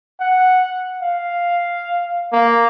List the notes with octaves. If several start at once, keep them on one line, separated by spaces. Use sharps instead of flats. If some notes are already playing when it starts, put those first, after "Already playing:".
F#5
F5
A#3